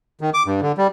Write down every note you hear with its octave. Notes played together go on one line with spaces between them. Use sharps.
D#3
D6
G2
D3
G3